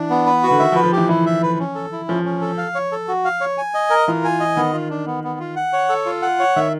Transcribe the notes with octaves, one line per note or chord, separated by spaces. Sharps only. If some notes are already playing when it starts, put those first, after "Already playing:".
Already playing: E3 D4
B3
B4
F#4
D3
D#3 E5
F3
B4
F3
E3 G4
E3 E4
E5
B4
C#4
A4
E4
F3 C#4
C#4
A4
F5
C#5
A4
F#4
F5
C#5
G#5
D#5
A#4
E3 F4
G#5
D#5
D#3 B3
F4
D4
B3
B3
F4
F#5
C#5
A4
F4
F#5
C#5
D#3 E5